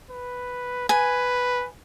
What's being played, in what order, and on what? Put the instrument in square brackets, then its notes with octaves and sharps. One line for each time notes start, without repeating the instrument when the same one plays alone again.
[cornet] B4
[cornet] B4 [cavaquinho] G#5